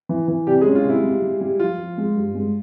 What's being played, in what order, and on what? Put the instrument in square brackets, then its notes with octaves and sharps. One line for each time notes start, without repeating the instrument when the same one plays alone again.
[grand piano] E3
E3
[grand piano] C3 [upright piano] G3 G4
[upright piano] G#3 G#4
[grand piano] C#4
[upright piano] F4
[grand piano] C3 [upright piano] E4
[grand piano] G3
G3
G3
[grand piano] F3 [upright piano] F4
[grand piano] F3
G#3
G2
G#3